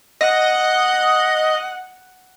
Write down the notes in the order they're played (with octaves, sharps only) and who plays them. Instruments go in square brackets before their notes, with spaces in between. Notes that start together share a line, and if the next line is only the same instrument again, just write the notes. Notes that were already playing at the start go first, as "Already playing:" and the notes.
[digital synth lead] D#5 [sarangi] F#5